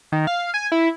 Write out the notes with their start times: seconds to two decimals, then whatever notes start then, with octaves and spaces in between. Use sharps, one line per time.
0.12 D#3
0.27 F5
0.54 G#5
0.72 E4